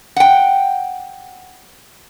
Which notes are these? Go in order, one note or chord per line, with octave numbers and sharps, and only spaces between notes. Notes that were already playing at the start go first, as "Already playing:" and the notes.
F#5 G5